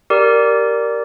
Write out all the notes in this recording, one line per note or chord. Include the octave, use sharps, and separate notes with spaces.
G4 A#4 D5